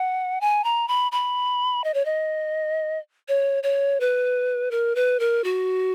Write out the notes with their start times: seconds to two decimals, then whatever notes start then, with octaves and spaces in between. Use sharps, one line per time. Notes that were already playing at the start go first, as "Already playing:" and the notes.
Already playing: F#5
0.41 G#5
0.64 A#5
0.88 B5
1.12 B5
1.84 D#5
1.94 C#5
2.05 D#5
3.28 C#5
3.63 C#5
4.00 B4
4.71 A#4
4.95 B4
5.20 A#4
5.44 F#4